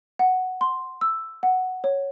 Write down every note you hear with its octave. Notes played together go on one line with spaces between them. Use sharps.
F#5
C6
E6
F#5
C#5